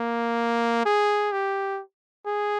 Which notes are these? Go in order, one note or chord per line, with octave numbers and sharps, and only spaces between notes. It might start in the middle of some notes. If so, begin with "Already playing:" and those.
Already playing: A#3
G#4
G4
G#4